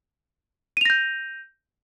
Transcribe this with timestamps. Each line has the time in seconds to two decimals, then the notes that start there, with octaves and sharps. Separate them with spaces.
0.77 D#7
0.81 F7
0.85 A#6
0.90 G6